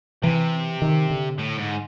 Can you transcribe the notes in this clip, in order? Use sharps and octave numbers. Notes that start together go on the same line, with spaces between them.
C3 E3
D#3
D3
A2
G#2